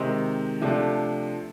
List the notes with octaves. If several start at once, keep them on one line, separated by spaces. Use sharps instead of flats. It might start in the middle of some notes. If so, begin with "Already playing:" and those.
Already playing: C3 D#3 G#3 C4 D#4
C3 F3 A3 D4